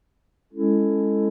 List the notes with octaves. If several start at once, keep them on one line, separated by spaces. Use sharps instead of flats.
G#3 C#4 E4 A4